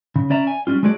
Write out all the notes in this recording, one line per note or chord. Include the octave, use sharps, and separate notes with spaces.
C#3
C#4 D5 E5 A#5
G#5
G3 C#4 F4
G#3 A3 F#4 G#4 D5